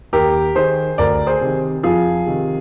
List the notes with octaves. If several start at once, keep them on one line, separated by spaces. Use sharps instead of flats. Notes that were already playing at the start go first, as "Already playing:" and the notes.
D#2 G4 A#4
D#3 G#4 C5
D2 A#4 D5
G#4 C5
C3 D#3
F2 F4 G#4
C3 D#3